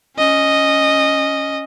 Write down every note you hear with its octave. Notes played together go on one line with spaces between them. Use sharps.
C#4 D#5